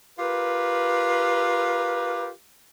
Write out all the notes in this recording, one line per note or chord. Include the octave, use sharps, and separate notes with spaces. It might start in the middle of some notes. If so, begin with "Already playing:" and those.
F4 G4 A#4 B4